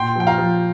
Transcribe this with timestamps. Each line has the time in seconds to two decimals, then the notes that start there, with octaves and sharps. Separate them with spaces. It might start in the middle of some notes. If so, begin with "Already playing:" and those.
Already playing: A#2 G5 C6
0.16 F3 G5
0.27 F5 A#5
0.38 F3